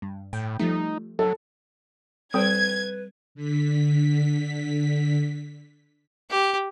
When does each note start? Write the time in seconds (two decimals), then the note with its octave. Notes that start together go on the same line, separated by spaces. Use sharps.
0.02 G2
0.33 A2 G5
0.59 F3 G3 A3 D#4
1.19 F#3 A4
2.34 G3 C4 A4 B4 G5 G#6
3.35 D3 B6
6.31 G4